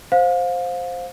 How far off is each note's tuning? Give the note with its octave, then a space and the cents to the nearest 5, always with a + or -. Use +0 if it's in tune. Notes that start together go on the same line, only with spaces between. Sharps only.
C5 +5 F5 +25